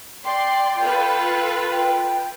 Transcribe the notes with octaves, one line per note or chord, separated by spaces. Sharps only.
D5 G5 C6
F4 A4 B4
G5